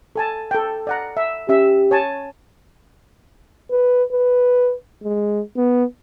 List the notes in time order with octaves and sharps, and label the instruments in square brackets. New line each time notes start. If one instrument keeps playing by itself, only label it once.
[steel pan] A4 G#5 A5
A4 G5
D5 F#5 A#5
E5
[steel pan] C#4 E5 [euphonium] G4
[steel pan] C#5 G#5 A5
[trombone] B4
B4
G#3
B3